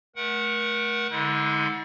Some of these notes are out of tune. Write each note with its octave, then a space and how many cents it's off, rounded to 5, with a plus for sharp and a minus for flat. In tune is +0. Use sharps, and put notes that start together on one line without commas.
A3 -25 A#4 +35 F#5 +0
D3 +0 G#3 +10 E4 -45